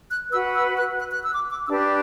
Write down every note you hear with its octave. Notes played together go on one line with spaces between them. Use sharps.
F#6
F#4 B4 E6
E6
F#6
F#6
F#6
E6
D6
D6
D4 G4 B4 E6